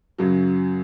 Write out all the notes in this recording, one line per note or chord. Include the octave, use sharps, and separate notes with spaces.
F#2 C#3 F#3